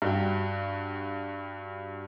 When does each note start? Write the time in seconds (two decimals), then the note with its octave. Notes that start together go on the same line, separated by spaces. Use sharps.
0.02 G2 F#4 G5